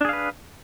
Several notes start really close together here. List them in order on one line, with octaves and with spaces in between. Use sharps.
D4 G#4 F5 B4